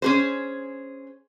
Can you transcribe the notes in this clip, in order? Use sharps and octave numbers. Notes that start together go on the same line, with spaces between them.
C#4 G#4 C5